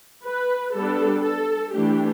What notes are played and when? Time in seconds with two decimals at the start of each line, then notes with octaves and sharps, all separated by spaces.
0.25 B4
0.75 G3 B3 D4 A4
1.24 A4
1.73 E3 A3 D4 G4